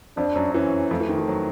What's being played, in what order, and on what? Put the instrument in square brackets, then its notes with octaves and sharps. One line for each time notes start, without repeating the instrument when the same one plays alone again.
[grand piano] F2 F3 [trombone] D4
[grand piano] F#2 F#3
[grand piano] E3 [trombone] C#4
[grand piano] F2 F3 [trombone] A3
[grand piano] E3
D#3
E3
F#3